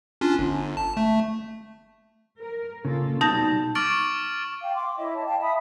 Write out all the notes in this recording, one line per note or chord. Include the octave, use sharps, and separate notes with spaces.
C#4 D4 F4
G1
A5
A3
A#4
C#3 A#3 F4 A4
B2 G3 D#4 A5 G6 A#6
C#6 D6 F6 A6 D7 F#7
F5 G5
C6 D6
E4 C#5 D#5 E5
A5
F5 G5 A5
E5 B5 D#6